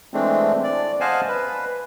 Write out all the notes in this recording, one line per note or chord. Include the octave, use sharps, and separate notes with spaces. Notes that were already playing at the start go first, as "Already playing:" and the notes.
E3 G#3 A3 C4 D4
D5
C5 D#5 F5 F#5 G#5 A5
B4